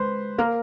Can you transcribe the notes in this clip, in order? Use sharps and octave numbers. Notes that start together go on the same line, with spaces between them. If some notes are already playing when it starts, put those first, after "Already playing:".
Already playing: G#3 B4 C5
A#3 A#4